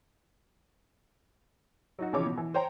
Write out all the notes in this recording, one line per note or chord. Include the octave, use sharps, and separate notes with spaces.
F#3 D#4 F#4
B1 C#3 E3 F3 C#5 D6
B2
E3
C5 C#5 G5 A#5